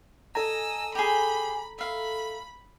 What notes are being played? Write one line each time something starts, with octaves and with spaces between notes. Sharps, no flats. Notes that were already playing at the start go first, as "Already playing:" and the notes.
A4 D#5 G#5 A#5 E6
G4 G#4 B5
E5 F5 B5